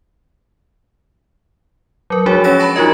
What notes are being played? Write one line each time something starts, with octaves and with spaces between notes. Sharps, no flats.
F#3 A#4
F3 G#3 D4 F#4 G#4 C#5
C#4 G#4 C#5 A#6 E7
A5 B5 C#6 A#6
F3 D#4 F4 F#4 A#4 D#5